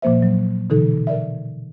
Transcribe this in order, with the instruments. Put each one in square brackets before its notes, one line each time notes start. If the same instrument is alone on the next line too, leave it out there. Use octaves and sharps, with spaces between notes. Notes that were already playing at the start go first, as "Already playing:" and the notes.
[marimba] A#2 F3 A#3 C5 E5
F#3
B2 D3 E3 D#4 A4
A#4 D5 E5